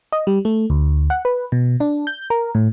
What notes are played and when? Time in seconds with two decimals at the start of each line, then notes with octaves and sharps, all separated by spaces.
0.12 D#5
0.27 G3
0.45 A3
0.70 D2
1.10 F#5
1.25 B4
1.52 B2
1.80 D4
2.07 G6
2.30 A#4
2.55 A2